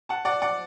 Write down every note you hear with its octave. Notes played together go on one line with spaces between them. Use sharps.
F#5 A5
D5 F#5
D5 F#5